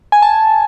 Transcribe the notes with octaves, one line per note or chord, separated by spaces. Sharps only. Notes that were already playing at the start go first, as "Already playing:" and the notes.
G#5
A5